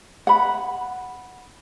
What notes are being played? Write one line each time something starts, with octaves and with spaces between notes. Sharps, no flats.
F#5 B5